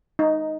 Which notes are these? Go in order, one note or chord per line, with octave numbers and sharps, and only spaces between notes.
D#4